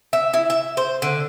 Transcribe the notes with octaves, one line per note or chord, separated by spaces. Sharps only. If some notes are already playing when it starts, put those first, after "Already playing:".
E5
E4
E5
C5
D3